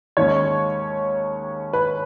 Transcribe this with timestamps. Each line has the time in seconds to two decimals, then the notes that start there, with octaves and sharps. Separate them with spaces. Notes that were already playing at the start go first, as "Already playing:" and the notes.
0.17 D#2 D#3 G#3 C#4 C#5
1.73 B4